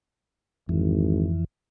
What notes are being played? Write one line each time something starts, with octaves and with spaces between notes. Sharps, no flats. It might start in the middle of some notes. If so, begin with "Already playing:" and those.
G#1 F2 E3